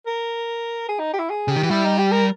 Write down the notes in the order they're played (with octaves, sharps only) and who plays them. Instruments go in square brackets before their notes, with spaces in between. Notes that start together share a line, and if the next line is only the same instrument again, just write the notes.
[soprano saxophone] A#4
G#4
D#4
G4
E4
G#4
[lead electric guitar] C#3
[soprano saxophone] G4
[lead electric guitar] D#3
E3
[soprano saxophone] G4
[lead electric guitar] G3 [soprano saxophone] E4
[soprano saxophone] D#4
G4
A#4